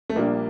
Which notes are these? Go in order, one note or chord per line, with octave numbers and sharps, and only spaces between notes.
A3
A#1 A#2 G3 A#3 D4